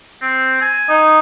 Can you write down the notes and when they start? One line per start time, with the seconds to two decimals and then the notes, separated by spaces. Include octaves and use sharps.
0.22 C4
0.62 G#5
0.89 D#4